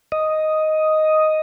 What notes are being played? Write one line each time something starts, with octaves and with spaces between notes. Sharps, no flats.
D#5